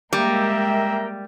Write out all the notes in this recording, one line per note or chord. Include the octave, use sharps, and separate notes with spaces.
G3 G#3 A#3 A#4 E5 G5 A#5